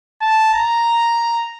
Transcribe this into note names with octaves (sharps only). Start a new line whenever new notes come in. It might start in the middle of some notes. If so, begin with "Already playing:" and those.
A5
A#5